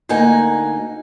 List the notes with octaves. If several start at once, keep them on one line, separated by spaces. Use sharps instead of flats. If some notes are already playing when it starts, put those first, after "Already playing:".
D2 A#3 D#4 F#5 G#5